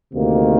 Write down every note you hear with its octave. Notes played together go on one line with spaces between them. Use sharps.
D2 C3 D#3 A#3